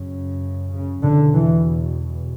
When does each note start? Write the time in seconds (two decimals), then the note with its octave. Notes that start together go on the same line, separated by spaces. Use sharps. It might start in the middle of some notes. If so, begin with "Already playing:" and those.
Already playing: F#2 C#3
0.73 C#3
1.03 E2 B2 D3
1.34 E3